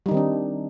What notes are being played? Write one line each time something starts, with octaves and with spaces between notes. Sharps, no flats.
D#3 G3 C4 D4 D#4